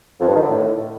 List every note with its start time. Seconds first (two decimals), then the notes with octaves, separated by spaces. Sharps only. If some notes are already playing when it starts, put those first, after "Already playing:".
0.20 F2
0.28 G2
0.35 D#3
0.42 D3
0.49 A2